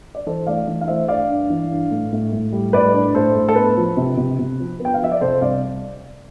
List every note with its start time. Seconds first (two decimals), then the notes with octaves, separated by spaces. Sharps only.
0.15 D5
0.26 E3 A4 C5
0.47 A3 D5 F5
0.68 E3
0.81 F5
0.88 A3 C5 E5
1.08 G2 D5 F5
1.29 G2
1.50 E3
1.70 G2
1.91 A2
2.13 A2
2.33 A2
2.53 G3
2.73 A2 B4 D5
2.94 D4
3.15 A2 A4 C5
3.35 A2
3.49 A4
3.56 B3 B4
3.77 F3
3.97 C3
4.17 C3
4.39 C3
4.60 F3
4.80 B3
4.85 G5
4.94 F5
5.00 F3 E5
5.12 D5
5.21 C3 A4 C5
5.41 C2 D5 F5